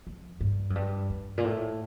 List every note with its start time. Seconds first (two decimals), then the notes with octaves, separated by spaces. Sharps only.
0.07 F2
0.41 G2
0.70 F#2
0.75 G2
1.10 G2
1.38 A#2
1.45 A2